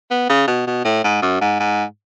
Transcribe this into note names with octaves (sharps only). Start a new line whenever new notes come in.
B3
C#3
B2
B2
A2
G#2
F#2
G#2
G#2